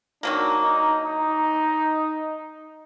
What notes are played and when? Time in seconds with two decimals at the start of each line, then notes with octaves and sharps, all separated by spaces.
0.23 D#3 F#3 A#3 D4
0.63 D#4
1.04 D#4